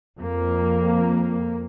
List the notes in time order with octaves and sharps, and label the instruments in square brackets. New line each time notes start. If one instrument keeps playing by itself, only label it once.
[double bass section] F2 A#3